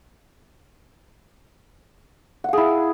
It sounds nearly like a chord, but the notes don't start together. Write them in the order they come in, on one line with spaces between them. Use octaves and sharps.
F#5 F5 G#4 E4